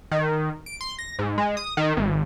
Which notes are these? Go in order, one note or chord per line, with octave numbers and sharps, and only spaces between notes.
D#3
D7
C6
A#6
G#2
G#3
D#6
D#3
G#1